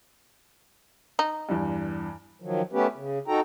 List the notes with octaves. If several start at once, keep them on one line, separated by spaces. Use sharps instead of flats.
D#4
E2 G2
D#3 F3 F#3
A3 B3 C#4 G4 B4
C#3
D#4 F#4 A4 G5 A#5